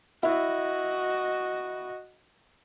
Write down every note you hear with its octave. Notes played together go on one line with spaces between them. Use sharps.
E4 F#4 D#5